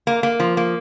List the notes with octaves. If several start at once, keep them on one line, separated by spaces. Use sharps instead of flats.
A#3
A#3
F3
A#3